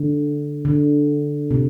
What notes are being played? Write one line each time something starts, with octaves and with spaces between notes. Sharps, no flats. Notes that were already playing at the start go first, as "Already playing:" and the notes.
Already playing: D3
D3
C3